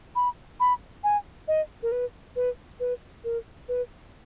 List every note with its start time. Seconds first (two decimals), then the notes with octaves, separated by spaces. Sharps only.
0.15 B5
0.60 B5
1.04 G#5
1.48 D#5
1.83 A#4
1.92 B4
2.36 B4
2.80 B4
3.24 A#4
3.68 B4